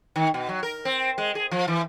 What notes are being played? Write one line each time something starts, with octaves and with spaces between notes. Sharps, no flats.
D#3
B2
F#3
A#4
C4
G#3
G#4
F3
E3